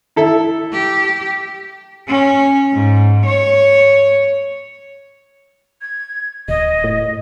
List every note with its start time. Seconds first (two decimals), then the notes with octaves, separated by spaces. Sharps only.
0.16 E4 A4 E5
0.72 G4
2.08 C#4
2.73 G#2
3.25 C#5
5.82 G#6
6.48 D1 D#5
6.84 A2